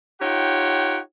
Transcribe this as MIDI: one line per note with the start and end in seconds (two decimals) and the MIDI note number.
0.21 0.99 63
0.21 0.99 65
0.21 0.99 67
0.21 0.99 73
0.21 0.99 78
0.21 0.99 79